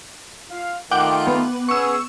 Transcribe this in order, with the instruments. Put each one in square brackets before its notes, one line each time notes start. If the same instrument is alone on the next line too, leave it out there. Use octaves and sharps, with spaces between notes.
[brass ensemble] F4 F5
[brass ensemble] D#3 A3 F4 [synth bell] F#5 G5 D6
[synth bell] B3
[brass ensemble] B3 C#4 G#4 [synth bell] C#6 E6